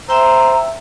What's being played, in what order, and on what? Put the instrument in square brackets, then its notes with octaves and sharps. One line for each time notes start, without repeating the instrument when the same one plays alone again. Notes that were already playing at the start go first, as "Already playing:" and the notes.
[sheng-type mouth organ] C5 [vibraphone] E5 G5 E6 [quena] A#5